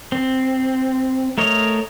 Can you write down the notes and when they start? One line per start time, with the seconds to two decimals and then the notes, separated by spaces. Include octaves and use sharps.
0.12 C4
1.38 A3 A#4 C#5 D#5